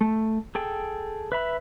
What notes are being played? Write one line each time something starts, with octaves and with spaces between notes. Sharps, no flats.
A3
G#4 A4 G5
B4 E5 B5